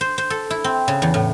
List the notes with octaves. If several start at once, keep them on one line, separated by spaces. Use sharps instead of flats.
C5
C5
A4
E4
C4
C#3
E2
A2